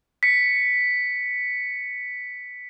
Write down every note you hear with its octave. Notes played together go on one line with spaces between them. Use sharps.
B6 C#7